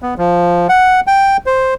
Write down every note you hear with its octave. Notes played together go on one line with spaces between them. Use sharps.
B3
F3
F#5
G5
C5